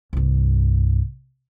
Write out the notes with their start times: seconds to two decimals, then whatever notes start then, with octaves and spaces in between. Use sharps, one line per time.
0.13 C2 G2